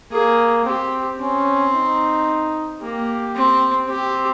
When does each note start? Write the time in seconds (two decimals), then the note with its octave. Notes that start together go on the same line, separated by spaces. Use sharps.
0.12 A#3 G#4
0.65 C4 G4
1.20 C4 C#4
1.74 D#4
2.81 A#3 G4
3.35 C4
3.89 C4 G4